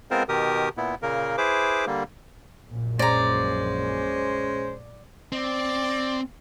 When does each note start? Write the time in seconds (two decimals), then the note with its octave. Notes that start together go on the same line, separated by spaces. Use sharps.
0.11 G#3 B3 C4 F4 A#4 C5
0.29 B2 D#3 G4 A#4 D#6
0.77 A#2 B3 E4
1.02 A#2 C#3 A#3 A#4
1.38 E4 G#4 B4 C5 D6
1.87 D3 G3 A#3
2.68 A#1 F#2 A#2
2.99 G#3 C#4 C5 D5 A#5
5.32 C4 D5